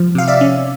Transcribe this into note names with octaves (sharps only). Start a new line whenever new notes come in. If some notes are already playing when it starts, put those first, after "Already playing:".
Already playing: F3
C3 F5
D5 E5
C#4